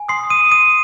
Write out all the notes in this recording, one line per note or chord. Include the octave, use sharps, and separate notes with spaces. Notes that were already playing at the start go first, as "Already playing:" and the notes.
Already playing: G#5
C6 D#6 C7
D#6 D#7
D#6 D#7